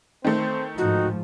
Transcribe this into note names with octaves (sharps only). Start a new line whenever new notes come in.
D#3 A3 C4
G#2 F3 D#4 F#4